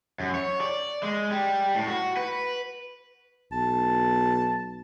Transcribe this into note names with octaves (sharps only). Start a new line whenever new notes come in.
F#2
C#5
D5
G#3
G3
A2
F#4
B4
B1 A5